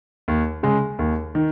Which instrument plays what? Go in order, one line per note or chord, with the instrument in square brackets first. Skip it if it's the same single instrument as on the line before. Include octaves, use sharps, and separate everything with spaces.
[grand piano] D#2
C#3 G#3
D#2
D#3